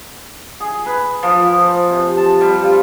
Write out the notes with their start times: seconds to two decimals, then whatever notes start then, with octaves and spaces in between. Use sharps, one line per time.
0.60 G#4
0.86 B4
1.23 F3
1.60 C5
1.90 C3
2.17 A5
2.41 G3
2.63 F4